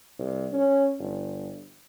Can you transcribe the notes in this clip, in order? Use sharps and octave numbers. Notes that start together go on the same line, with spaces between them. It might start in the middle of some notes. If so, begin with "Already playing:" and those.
C2
C#4
G1